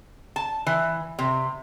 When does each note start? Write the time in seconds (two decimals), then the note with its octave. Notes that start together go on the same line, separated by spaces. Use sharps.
0.36 A5
0.66 E3
1.19 C3